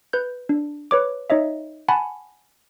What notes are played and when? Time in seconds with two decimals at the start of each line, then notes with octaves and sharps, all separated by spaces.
0.13 B4 G6
0.49 D4
0.91 B4 C#5 D6
1.30 D#4 C#5 D#5 E5
1.88 F#5 G#5 A5 B5 C#6